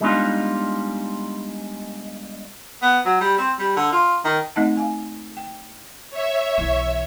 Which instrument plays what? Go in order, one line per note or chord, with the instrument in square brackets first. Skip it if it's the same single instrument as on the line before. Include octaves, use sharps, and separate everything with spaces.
[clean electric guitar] G3 G#3 B3 D4 D#4 F4
[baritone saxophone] B3
F#3
G3
C4
G3
D3
F4
D#3
[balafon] A3 C4 D#4 D#5 F#5 A5
F5 G#5
G5
[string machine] C#5 E5
[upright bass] B1 E3